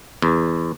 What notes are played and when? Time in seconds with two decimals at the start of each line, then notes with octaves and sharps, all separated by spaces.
0.22 E2